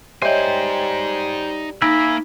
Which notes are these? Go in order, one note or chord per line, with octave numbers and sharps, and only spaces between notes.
G3 D#4 C5 C#5 D#5 E5 G5 G#5
A#3 D#4 E5 G#5 B5